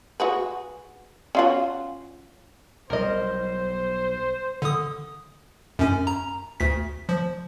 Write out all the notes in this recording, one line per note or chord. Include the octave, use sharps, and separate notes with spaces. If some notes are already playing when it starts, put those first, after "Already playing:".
F#4 G#4 B4
C#4 F4 F#4
B1 F#3 G3 A#4 C5 D#5
D3 D#6
F#2 C#4
A#5
D2 B6
F3